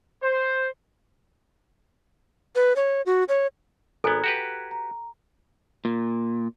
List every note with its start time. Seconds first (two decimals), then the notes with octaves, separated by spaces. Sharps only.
0.22 C5
2.56 B4
2.76 C#5
3.06 F#4
3.29 C#5
4.04 G#1 B3 A4 G#5 A#5 F#6 G#6
4.24 F#4 G4 B4
4.71 A#5
5.85 A#2